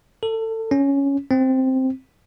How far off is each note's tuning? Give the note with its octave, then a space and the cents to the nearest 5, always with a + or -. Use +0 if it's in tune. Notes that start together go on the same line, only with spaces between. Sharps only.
A4 +25
C#4 +5
C4 +0